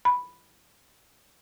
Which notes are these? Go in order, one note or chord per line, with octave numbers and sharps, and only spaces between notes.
B5